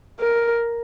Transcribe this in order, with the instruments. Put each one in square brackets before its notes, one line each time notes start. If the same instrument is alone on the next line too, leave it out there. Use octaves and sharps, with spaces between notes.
[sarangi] A#4